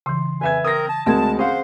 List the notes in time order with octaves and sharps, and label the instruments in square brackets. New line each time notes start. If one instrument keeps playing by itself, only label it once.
[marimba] C#3 E3 [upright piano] C6
[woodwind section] F2 G#5 [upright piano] B4 E5 G#6
[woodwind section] C4 A#4 [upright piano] D#6 A#6
[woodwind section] A5
[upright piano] D2 G#3 [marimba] C4 A#4 G#6 [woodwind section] A5
[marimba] C#4 [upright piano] G#4 F5 F#5 [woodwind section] C5